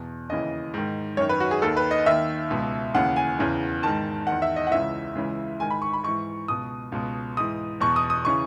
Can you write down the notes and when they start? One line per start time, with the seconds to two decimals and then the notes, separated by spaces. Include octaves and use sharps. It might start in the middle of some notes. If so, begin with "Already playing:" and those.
Already playing: E2 B2
0.29 D#2 C#3 E3 D#5
0.74 G#2 D#3
1.17 F#2 D#3 C#5
1.29 B4
1.40 F#4
1.51 G#4
1.62 D#2 D#3 A4
1.77 B4
1.91 D#5
2.06 D#2 D#3 E5
2.50 C#2 B2
2.94 D#2 C#3 E3 F#5
3.16 G#5
3.38 E2 C#3 E3
3.83 G#2 D#3 A5
4.27 E2 D#3 F#5
4.42 E5
4.56 D#5
4.67 F#5
4.71 C#2 C#3 E3 E5
5.15 C#2 C#3 E3
5.60 G#2 D#3 G#5
5.70 B5
5.82 C#6
5.93 B5
6.04 G#2 E3 C#6
6.48 C#2 B2 D#6
6.92 C#2 B2
7.37 G#2 E3 D#6
7.81 E2 B2 C#6
7.96 D#6
8.10 D#6
8.25 C#3 E3 C#6